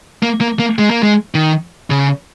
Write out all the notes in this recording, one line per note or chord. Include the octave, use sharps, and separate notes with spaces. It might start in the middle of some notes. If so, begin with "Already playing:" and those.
A#3
A#3
A#3
G#3
A#3
G#3
D#3
C#3